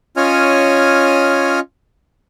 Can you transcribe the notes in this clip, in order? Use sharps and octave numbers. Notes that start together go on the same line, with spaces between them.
C#4 F4 C#5 D#5 G#5 F6